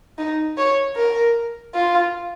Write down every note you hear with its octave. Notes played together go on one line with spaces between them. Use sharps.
D#4
C#5
A#4
F4